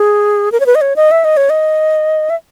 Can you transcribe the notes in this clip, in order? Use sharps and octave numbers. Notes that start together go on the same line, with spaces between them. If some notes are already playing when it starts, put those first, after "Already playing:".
Already playing: G#4
A#4
C#5
B4
D#5
C#5
D#5
E5
D#5
C#5
D#5
E5